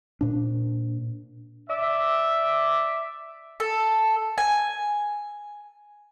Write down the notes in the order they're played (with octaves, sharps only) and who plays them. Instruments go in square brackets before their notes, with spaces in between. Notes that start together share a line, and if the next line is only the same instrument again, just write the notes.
[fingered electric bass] A#2 D4
[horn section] D5 E5
[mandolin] A4
G#5